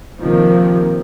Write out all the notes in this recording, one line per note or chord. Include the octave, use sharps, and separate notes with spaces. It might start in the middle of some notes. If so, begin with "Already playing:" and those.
C3 D#3 F3 A#3